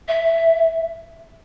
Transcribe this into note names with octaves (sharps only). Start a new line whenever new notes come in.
E5